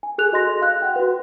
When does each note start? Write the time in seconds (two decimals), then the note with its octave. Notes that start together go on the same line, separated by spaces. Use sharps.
0.03 G#5
0.18 G#4 A4 F#6 F7
0.32 F#4 D#5 C6 A#6
0.61 F5 F#6
0.82 F#5 G5
0.96 F#4 B4